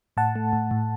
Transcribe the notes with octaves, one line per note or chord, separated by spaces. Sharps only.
A2 F#5 A5
A3
A2
A2